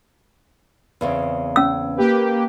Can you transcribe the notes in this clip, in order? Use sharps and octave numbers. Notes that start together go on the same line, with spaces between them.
E2 C#3 C4
C#4 E6
A#3 G4 B4